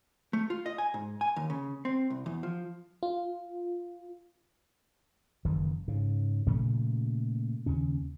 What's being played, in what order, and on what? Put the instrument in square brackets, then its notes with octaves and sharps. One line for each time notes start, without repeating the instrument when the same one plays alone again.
[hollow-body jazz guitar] A3
F4
D#5
G#5
G#2
G#5
D#2
C#3
C4
C2
E2
F3
[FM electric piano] F4
[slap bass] F#1 D#3 E3
G#2 C#3
A#2 C#3 F3 A3
D#2 C#3 C#4